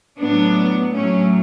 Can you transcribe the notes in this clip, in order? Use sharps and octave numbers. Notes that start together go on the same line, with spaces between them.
A2 F#3 B3 D4
A2 F#3 A3 C#4